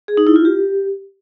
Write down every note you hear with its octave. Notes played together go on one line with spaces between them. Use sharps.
G#4
D#4
E4
F4
G4